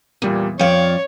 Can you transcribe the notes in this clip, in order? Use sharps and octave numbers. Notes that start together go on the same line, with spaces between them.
E2 A#2 G3 A#3
F2 C#5 D5 F5 G5 C#7